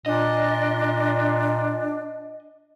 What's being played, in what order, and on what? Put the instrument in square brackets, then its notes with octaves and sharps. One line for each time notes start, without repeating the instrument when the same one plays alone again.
[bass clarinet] A#2 [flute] D4 [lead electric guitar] D#5